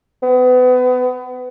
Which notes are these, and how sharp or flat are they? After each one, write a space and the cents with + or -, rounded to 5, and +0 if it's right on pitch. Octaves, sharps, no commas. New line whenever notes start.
B3 +30